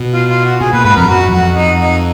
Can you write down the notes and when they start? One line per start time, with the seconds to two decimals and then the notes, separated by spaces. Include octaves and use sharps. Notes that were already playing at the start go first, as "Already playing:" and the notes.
Already playing: B2
0.13 F4
0.29 F4
0.45 F#4
0.61 B2 G#4
0.73 A#2 B4
0.84 G#2 B4
0.96 F2 A#4
1.08 F#2 F#4
1.32 F2 F#4
1.55 D#4
1.80 D#4